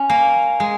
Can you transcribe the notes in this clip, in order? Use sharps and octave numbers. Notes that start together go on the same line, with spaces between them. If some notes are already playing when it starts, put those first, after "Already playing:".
Already playing: C#4
A#3
G#3